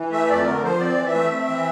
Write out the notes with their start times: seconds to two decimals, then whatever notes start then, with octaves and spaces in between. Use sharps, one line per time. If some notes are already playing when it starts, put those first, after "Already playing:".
Already playing: E3
0.11 A3 E5
0.28 F2 D5
0.45 D3 A#4
0.63 F3 C5
0.80 C4 D5
0.97 E3
1.06 E5
1.15 A3
1.31 C4
1.48 E3